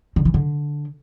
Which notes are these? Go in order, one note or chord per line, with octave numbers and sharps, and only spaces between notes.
D3
E3
D3